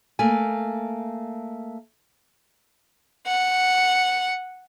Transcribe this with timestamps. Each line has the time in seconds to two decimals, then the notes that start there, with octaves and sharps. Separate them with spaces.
0.19 A3 A#3 G#5
3.27 F#5